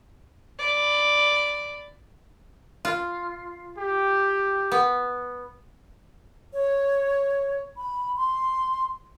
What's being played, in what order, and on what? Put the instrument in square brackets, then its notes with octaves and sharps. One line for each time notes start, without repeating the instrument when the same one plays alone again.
[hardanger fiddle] D5 B5
[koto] F4
[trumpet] G4
[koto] B3
[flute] C#5
B5
C6